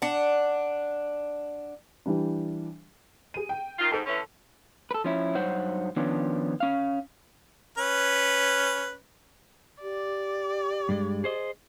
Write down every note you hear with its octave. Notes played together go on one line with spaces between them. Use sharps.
D4 F#5
E3 G3 D4
G#4 D#7
G5
D#3 F4
G#2 A4
D3 E3 C#4
A4 B4
F3 C#4 E4
G2 F#3 D#4 C5 C#5 F#5
D#3 F3 B3 C#4 D4
C#4 F5
C#4 B4
G4 D5
G2 G#3
G#4 C5 D#5